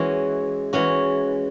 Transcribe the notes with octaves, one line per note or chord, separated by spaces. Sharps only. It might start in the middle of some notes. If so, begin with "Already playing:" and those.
Already playing: E3 G#3 C#4 F#4
E3 G#3 C#4 F#4